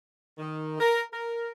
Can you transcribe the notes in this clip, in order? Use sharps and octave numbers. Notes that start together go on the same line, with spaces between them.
D#3
A#4
A#4